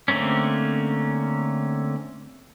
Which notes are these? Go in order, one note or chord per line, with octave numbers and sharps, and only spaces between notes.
D3 A3 A#3 C4 C#4